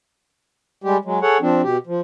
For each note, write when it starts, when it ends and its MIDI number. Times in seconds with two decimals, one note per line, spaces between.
0.84 0.97 55
0.84 0.97 56
0.84 0.97 67
1.05 1.19 54
1.05 1.19 56
1.22 1.37 68
1.22 1.37 69
1.22 1.37 73
1.22 1.37 78
1.41 1.62 53
1.41 1.62 60
1.41 1.62 62
1.63 1.77 47
1.63 1.77 67
1.87 2.01 53